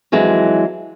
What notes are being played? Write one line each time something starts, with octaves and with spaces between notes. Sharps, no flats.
F2 E3 F#3 G#3